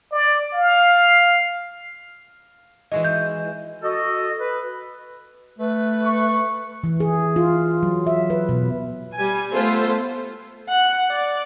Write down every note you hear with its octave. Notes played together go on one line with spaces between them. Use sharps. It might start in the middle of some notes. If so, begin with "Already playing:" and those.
D5
F5
E3 G#3 F#4 D#5
G6
F#4 A4 D#5
B4
A3 B4
C#6
E3
G#4
F4
F#3
E5
B4
B2
G3 G#5
A3 B3 F4 A4 C5
F#5
D5